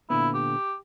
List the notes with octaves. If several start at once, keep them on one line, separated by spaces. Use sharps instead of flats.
A#2 D3 B3 E4
G4